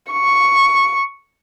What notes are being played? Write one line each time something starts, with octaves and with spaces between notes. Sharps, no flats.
C#6